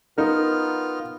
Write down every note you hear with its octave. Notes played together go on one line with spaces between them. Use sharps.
B3 D#4 F4 A#4 F6